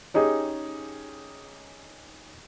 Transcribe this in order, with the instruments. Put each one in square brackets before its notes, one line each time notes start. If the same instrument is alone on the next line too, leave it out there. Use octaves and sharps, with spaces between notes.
[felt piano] C#4 D#4 G4 G#4